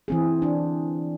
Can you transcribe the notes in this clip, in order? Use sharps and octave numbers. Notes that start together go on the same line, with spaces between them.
E3 C4 G#4
D4